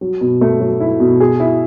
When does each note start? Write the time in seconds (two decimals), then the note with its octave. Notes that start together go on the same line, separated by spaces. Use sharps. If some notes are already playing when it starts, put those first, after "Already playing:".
0.01 F#3
0.21 B2
0.41 A3
0.60 F#3
0.80 E4
1.00 B2
1.20 G#4
1.40 E4